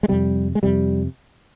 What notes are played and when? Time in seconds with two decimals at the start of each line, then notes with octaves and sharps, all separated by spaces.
0.03 G#3
0.08 F2 C3 G3
0.55 G#3
0.63 F2 C3 G3